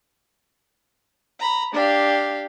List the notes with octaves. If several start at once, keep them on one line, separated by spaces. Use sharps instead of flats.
A#5 B5
D4 G4 F5